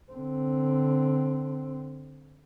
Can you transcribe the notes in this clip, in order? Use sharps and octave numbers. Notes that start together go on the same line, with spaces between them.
D3 C4